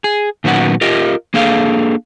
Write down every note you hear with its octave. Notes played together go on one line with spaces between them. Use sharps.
G#4
A#2 D#3 F#3 B3 C#4 F#5
F4 G4 A#4 D#5
A#3 D4 G#4 A4 F5